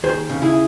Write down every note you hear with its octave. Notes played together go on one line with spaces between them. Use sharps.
D#2 G#4 C5
C#3
E4 G#4